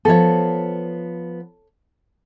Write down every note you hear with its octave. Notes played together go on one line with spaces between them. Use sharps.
F3 B3 A4 C#5